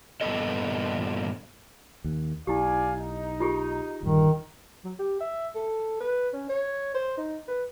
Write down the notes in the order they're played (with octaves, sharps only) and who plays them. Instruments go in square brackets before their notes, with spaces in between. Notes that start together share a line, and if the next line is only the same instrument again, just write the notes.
[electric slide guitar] G2 A#2 F3 B3 A4 D#5
[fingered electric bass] D#2
[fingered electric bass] B1 [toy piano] E4 G4 [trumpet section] D5 F5 G#5
[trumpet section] D#4
[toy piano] F4 G4 G#4
[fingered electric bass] D#1 G2 D3 [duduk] D#3
[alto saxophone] F#3
G4
E5
A4
B4
C#4
C#5
C5
D#4
B4